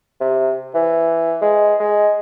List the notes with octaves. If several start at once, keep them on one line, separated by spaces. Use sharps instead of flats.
C3
E3
G#3
G#3